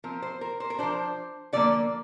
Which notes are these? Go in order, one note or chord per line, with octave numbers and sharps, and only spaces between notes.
F3 C4 A#4
C5
A#4
C5
A#4
F3 D4 C5
D3 F3 A#3 D5